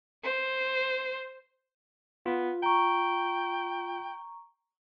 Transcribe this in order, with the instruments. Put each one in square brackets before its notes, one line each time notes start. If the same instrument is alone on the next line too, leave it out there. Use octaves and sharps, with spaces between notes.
[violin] C5
[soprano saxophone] B3 [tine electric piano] F4
[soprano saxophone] G5 [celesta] A#5 C#6